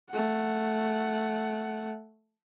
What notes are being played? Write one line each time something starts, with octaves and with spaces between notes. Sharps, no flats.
A3 F#5